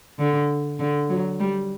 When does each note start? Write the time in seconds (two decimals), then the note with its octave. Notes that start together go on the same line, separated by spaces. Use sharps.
0.19 D3
0.79 D3
1.09 F#3
1.40 G3